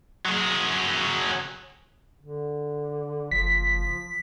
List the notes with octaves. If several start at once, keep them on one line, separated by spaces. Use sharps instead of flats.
F#3 G#4
D3
F#1 F3 B6